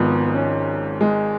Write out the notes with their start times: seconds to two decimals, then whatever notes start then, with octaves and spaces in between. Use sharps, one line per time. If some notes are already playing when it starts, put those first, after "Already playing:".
Already playing: G#1 G#2 F3 B3
0.35 C#4
1.01 G#3